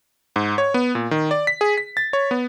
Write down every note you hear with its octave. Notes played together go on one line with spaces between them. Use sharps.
G#2
C#5
B3
A#2
D#3
D5
B6
G#4
B6
A6
C#5
B3